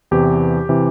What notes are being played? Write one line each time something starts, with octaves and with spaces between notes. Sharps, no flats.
E2 C3 E3 G4
C3 E3